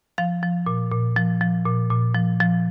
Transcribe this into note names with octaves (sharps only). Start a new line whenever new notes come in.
F3 F5
F3
A#2
A#2
F3
F3
A#2
A#2
F3
F3